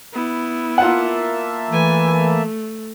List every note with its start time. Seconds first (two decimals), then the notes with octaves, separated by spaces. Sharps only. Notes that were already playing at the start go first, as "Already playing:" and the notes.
0.13 B3 E4
0.78 A#3 F4 E5 F#5 A5
1.69 E3 A3 G#5
2.16 A3